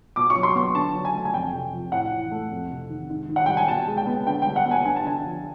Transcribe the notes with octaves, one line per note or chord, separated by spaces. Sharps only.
B2 D6
C#6
F#3
C6
B3 C#6
D3 A5
F#3
G#5
A3
G#5
F2 G5
C3
F3
A2 F#5
E3
A3
F2
C3
D#3
G#2
D#3
F#5
G3 G5
G#5
B2 A5
G#3
G5
B3
D3 G5
G3 G5
F#5
B3
G#5
G2 G#5
A5
D3 G#5
F3